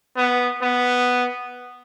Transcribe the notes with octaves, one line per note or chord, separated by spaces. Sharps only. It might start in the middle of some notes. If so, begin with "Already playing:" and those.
B3
B3